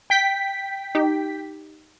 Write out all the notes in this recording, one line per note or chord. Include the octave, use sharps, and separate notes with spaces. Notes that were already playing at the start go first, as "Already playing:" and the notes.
G5 B6
D#4 G4